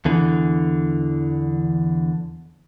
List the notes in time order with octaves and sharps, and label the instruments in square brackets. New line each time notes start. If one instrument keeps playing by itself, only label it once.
[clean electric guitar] E2 D3 E3